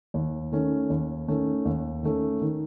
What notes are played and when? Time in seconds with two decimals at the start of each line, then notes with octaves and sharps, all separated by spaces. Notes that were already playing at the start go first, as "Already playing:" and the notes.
0.14 D#2
0.52 D#3 A3 C#4
0.90 D#2
1.28 D#3 A3 C#4
1.65 D#2
2.03 D#3 A3 C#4
2.41 D#3